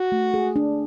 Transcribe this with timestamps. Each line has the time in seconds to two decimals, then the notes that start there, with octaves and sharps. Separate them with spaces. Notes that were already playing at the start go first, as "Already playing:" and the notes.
Already playing: F#4
0.12 A3
0.34 G#4
0.56 D4